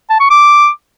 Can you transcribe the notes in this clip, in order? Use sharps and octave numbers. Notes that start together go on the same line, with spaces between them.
A5
C#6
D6